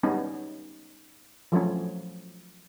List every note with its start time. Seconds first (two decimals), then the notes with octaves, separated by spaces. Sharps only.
0.03 G3 B3 C#4 D#4
1.52 F3 F#3 A3 C#4